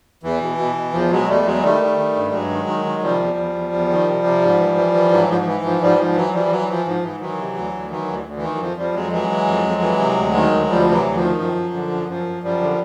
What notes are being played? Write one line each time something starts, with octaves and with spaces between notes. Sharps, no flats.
E2 E3
B2
B2
B2
E2 F3
B2 F#3 G#3
E2 G3 A3
E2 F#3 G#3
D#3 G3 A3
D#3
D#3
G2
G2 F#3 G#3
D#3
D#3
D#3
G#3
C3 F3 G3
E2
E2
E2
E2
D#3
C3
C3
G#2
E3
E3
E3
G#2 E3 F#3
G#2 F3
F3
E3
G#2 F3
G#2 F3 G3
E3
G#2 F3
E3 F#3
E3 F3 G3
F3
E3 F#3
E3 F3
G#2 F3
G#2 E3
D#3 E3 F#3
C3
D2
D2
D#3 E3 F#3
D2
D2
E3
D#3
F#3
F2 F3
F2 F3 G3
F2 F#3 G#3
E3 F#3 G#3
E3
F2
F2
E3
C3
D2
D#3
D2
D2 F3 G3
C3 E3 F#3 G3
D2
F3
D#3
F#2 F3
F#2
D3
F#2
F#2 F3
F#2
F#2 F3 G3
D3